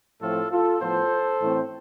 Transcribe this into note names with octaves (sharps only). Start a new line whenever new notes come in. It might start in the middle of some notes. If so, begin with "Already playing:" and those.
A2 F3 A3 C4 F4 A4
F4 A4
A2 F3 B3 A4 C5
A2 E3 A3 C4